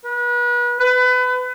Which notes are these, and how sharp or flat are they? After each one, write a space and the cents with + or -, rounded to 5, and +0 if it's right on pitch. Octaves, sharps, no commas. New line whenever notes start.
B4 -35
B4 +30